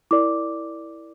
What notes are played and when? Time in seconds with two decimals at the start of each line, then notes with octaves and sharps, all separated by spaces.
0.11 E4 A#4 D5 D6